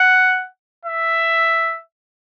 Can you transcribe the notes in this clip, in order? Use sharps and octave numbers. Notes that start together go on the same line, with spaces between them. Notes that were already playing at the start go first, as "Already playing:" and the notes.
Already playing: F#5
E5